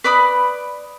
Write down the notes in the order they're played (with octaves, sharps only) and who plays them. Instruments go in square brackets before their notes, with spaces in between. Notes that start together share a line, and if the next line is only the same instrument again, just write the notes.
[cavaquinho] B4 D5 B5 D#6